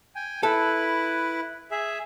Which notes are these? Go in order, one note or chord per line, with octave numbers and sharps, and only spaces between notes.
G5 G#5
E4 A4 B4
G#4 E5